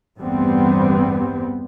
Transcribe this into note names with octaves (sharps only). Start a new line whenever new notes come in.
A1 E2 G2 G3 B3 C4